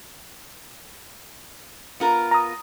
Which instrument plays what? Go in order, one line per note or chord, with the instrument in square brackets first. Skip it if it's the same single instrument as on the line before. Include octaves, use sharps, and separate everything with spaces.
[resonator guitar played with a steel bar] B3 F4 A#4
[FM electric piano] A#5 D#6